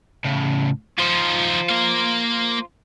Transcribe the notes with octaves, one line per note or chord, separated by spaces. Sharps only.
A2 C#3
F3 D#4 F4 C5
A#3 F5